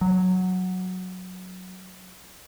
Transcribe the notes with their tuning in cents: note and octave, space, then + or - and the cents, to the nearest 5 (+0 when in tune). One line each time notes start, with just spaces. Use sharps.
F#3 -5